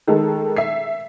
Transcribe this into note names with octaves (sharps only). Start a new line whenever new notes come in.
D#3 G#3 A4
E5 C7